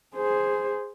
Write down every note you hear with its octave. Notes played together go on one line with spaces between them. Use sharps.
G#4 C5